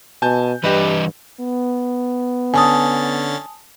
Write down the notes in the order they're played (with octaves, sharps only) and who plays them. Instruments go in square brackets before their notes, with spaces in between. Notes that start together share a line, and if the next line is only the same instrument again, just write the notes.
[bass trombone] B2 [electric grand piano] G#5 A5 G6
[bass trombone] G2 [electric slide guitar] E3 G3 D#5 [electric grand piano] G4 B4
[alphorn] B3
[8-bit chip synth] D3 C#4 A6 [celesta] G#5 A5 D#6